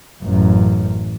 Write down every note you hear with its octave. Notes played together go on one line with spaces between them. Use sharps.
A1 F#2